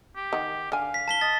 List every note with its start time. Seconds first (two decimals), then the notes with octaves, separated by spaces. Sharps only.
0.16 G4
0.33 D#3 F#5
0.72 D3 F5 G#5
0.94 B6
1.08 A5 B6 G7
1.21 D#5 A6